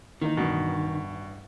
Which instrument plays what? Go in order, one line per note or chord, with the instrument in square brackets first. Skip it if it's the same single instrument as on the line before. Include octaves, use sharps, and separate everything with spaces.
[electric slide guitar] D#3 [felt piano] E3 A#3 D#4
[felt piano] A1 G2 [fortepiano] B2